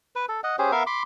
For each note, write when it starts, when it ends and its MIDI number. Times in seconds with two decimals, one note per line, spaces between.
0.16 0.26 71
0.29 0.41 69
0.44 0.56 75
0.44 0.56 78
0.59 0.71 61
0.59 0.71 67
0.59 0.71 68
0.59 0.71 72
0.72 0.83 59
0.72 0.83 70
0.72 0.83 76
0.72 0.83 77
0.87 1.03 83
0.87 1.03 84
0.87 1.03 86